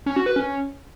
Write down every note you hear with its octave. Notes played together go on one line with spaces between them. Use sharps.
C#4
F#4
B4
C#4